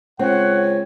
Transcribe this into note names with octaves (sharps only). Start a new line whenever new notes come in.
C#2 C4 C#5 F#5